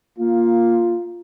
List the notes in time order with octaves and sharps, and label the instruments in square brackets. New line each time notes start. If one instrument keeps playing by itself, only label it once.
[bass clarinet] A#3 [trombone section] F4